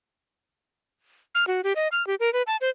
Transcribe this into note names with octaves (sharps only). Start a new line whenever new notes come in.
F6
F#4
G4
D#5
F6
G4
A#4
B4
A5
C5